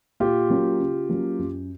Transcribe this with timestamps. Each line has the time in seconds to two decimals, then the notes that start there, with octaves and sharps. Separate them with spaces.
0.20 A#2 F4 G4
0.50 F#3 A#3 C#4
0.79 C#3
1.09 F#3 A#3 C#4
1.39 F#2